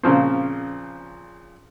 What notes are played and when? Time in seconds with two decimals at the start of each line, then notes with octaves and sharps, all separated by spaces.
0.03 A#2 C#3 F3 C4